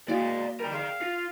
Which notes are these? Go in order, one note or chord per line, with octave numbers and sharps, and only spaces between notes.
G#3 A#3 E4 F#4 D5 F5
G3 A#4 G5
G#4 D5 F5
F4 A#6